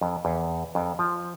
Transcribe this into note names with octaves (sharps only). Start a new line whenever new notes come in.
F2
E2
F2
F3